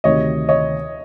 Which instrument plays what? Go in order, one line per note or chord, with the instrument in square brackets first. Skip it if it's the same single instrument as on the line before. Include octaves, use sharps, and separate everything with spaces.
[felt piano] D2 C3 D#3 [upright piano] C#5 D#5
[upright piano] C#5 D#5